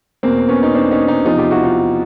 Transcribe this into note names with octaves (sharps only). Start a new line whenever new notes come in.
E2 B2 A#3 C4
B3 C#4
D#4
C4 D4
C#4 D#4
C#4 D#4
E2 C3 F3 D#4 F4
F4 G4
E4 F#4
D#4 F4